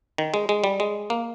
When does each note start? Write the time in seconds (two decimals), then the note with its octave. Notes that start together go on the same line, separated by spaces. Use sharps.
0.18 D#3
0.34 G#3
0.49 G#3
0.64 G3
0.80 G#3
1.10 A#3